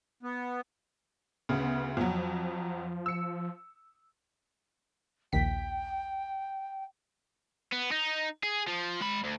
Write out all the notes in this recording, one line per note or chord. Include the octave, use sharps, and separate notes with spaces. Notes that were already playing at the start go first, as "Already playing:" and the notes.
B3
D2 C#3 B3
F2 F3 F#3
E6 C#7
A#1 D#2 G5 B6
B3
D#4
G#4
F3
G#3 B5
D2